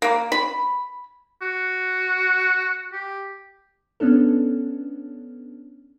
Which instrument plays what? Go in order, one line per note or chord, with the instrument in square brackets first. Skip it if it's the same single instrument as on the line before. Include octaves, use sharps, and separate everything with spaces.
[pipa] A#3
B5
[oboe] F#4
G4
[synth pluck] B3 C#4 D4 A4